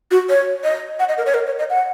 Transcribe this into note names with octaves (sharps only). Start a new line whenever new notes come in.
F#4
C#5
D#5
F#5
D#5
A#4
C#5
A#4
C#5
D#5
F#5